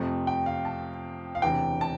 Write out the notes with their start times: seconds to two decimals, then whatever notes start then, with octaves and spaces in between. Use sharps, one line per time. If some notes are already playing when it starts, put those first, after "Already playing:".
Already playing: F2 C3 F3 A3
0.27 G5
0.46 F5
0.65 A5
1.35 F5
1.42 E1 D2 C3 E3 G5
1.81 A5